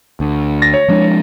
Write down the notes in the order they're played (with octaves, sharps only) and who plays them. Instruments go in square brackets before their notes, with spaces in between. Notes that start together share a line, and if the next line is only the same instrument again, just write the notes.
[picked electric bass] D2
[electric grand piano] A6 A#6
C#5
[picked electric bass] F3 G#3 D4